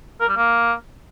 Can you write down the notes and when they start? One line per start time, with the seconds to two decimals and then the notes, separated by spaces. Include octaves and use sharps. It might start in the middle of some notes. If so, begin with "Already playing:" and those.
0.21 A#4
0.29 G3
0.37 A#3